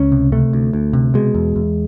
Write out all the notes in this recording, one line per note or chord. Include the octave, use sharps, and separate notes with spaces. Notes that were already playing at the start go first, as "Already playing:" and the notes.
Already playing: C#2 C#4
C3
C3 A3
D2
D2
C3
B2 G#3
E2
E2